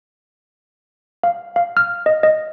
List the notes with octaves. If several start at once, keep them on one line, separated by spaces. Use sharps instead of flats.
F5
F5
F6
D#5
D#5